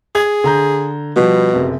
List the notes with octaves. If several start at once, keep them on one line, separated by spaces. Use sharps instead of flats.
G#4 G#6
D3 A#5 G6
B2 F3 G3
F#1 C3